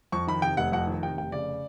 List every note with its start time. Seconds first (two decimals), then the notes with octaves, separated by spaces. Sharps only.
0.12 F2 C#6
0.28 D#3 B5
0.42 C3 G5
0.57 F1 F#5
0.72 F2 F#5
0.87 D#3
1.02 C3 G5
1.17 F1 G5
1.32 C#3 D5